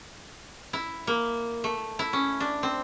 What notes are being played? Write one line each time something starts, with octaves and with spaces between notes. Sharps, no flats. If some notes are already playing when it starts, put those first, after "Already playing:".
E4
A#3
A3
E4
C#4
D4
C4